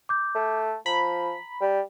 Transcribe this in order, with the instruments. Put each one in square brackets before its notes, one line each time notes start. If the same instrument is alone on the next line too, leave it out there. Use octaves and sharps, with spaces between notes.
[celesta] D6 G6
[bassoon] A3
[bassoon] F3 [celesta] A#5 [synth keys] B5
[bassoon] G3